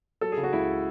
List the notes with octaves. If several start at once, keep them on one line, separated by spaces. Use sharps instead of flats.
F#3 A4
G#4
C#3
F#4
C#2 E4